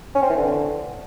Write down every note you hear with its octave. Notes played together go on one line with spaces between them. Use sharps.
C#4
C4
E3
D3